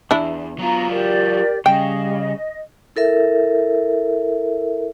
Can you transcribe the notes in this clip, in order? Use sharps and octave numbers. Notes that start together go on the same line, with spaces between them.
B1 E2 D4 E4
F#3 B3 F4 A#5
G4 A#4 D5
C#3 G3 D#5 G5
E4 A4 A#4 E5